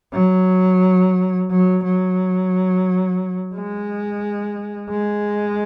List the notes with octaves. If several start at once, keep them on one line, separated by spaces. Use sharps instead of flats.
F#3
F#3
F#3
G#3
G#3